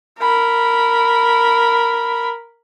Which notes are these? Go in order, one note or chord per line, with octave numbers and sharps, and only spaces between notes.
A#4 B5